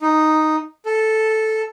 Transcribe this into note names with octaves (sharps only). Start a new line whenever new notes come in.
D#4
A4